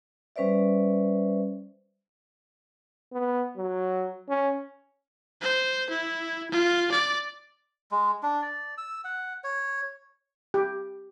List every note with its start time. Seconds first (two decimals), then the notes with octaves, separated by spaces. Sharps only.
0.36 G3 C#4 B4 C5 D5 E5
3.12 B3
3.57 F#3
4.29 C#4
5.41 C5
5.89 E4
6.51 F4
6.91 D5
7.91 G#3
8.23 D4
8.42 D5
8.78 E6
9.04 F#5
9.44 C#5
10.54 G4